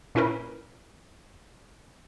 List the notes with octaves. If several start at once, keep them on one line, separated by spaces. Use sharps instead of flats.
A#2 C#4 E4 A#4 B4